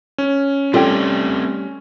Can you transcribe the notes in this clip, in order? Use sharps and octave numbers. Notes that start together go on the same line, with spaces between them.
C#4
G3 A3 C4 F4 A4 G5 G#5